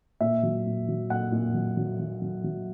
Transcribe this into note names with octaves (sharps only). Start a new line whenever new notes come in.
A#2 E5
F#3
A#2
F#3
A#2 F#5
A#2
F#3
F#3
F#3
F#3
F#3